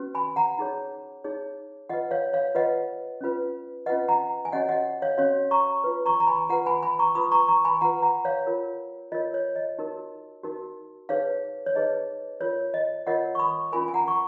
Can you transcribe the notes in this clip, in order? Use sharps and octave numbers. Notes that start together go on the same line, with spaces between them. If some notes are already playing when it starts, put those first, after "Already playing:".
Already playing: C#4 F#4 B4
G#5 B5
F#5 A#5
D#4 G#4 C#5
D#4 G#4 C#5
F4 B4 D#5 F#5
C#5 F5
C#5 F5
F4 B4 D#5 F#5
C#4 F4 B4
C#4 F4 B4 D#5 F#5
F#5 A#5
G#5
C#4 F#4 C#5 D#5 F#5
D#5 F#5
C#5 F5
C#4 F#4 C#5 F5
A#5 C#6
F4 B4
A#5 C#6
A#5
G#5 B5
F4 B4 F#5 A#5
G#5 B5
G#5 B5
A#5 C#6
F4 B4 B5 D#6
A#5 C#6
A#5 C#6
G#5 B5
F4 B4 F#5 A#5
F#5 A#5
C#5 F5
F4 A#4 C#5
F4 A#4 C#5 D#5
C#5
D#5
D#4 F#4 A#4
D#4 F#4 A#4
D#4 G#4 B4 C#5 F5
C#5
D#4 G#4 B4 D#5
F4 A#4 C#5
D#5
F4 A#4 C#5 D#5 F#5
C#6
B5 D#6
C#4 F4 A#4 G#5 B5
G#5
F#5 A#5
C#6